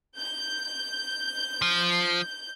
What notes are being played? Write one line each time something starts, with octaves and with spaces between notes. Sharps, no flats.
G6
F3